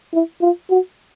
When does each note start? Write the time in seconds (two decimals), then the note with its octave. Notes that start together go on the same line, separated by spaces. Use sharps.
0.13 E4
0.41 F4
0.70 F#4